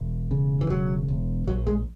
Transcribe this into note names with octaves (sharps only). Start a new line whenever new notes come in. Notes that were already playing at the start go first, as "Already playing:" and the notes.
Already playing: E1
C#3
E3
E1 F#3
E1
A#1 F#3
G#3